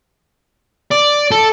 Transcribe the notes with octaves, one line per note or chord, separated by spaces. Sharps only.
D5
A4